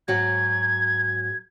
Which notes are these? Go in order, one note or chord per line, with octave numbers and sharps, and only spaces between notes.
G#2 F#3 F#4 G#6